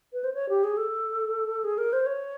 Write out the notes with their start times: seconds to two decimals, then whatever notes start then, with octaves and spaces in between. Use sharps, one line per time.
0.13 B4
0.24 C5
0.34 C#5
0.49 G4
0.64 G#4
0.77 A4
1.64 G#4
1.78 A#4
1.93 C5
2.06 C#5